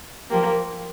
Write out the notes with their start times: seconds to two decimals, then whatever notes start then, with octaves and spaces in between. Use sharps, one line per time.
0.30 F3 A#3 G4